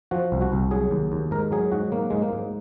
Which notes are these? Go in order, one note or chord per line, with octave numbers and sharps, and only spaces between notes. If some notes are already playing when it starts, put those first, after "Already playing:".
F3 F#4
C2
F#4
C2
F#3 G#4
D#2
D#2
G#2 A#4
F#3 G#4
G#2 F#4
F#3 A#3
G#2 G#3
A#3
G#2